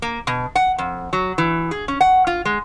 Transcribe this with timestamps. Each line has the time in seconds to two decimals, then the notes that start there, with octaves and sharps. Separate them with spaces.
0.02 A#3
0.27 B2
0.55 F#5
0.78 F2
1.13 F#3
1.38 E3
1.71 G#4
1.88 C#4
2.01 F#5
2.27 F4
2.45 G#3